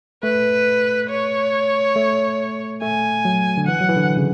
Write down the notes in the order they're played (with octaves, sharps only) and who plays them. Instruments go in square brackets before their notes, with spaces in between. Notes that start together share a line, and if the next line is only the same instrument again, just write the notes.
[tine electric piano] A3 [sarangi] B4
[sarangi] C#5
[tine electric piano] A3
[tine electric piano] A3 [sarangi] G#5
[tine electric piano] F#3
D3
[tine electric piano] E3 [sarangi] F#5
[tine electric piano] F#3
E3
D3
C#3